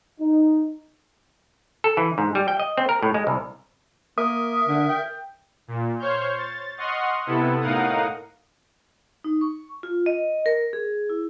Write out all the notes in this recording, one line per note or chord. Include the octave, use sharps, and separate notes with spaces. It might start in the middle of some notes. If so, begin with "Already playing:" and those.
D#4
A4
E3
G#2
G3
G5
D#5
C4
A#4
A2
G#3
C2
A#3 A#4 E5 D#6
D3
G5
A#2
C5 C#5 C#6 F6 G6
A6
D#5 F#5 C6 C#6 D#6 F6
C3 B3 E4 A4
A2 D#4 A#4 F5 F#5 D#6
D#4
C#6
F4
D#5
A#4
G#4
E4